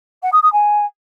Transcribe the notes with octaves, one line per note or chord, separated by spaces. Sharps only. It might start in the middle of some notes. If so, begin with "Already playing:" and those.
F#5
D#6
D#6
G#5